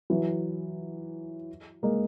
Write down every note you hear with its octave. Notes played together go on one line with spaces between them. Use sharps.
E3 F#3
G#3 A#3